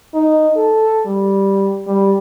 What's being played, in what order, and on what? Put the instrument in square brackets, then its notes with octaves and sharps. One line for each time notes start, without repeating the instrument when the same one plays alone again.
[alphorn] D#4
A4
G3
G3